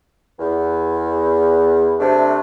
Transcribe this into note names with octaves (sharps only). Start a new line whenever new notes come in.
E2
C3 A3 D4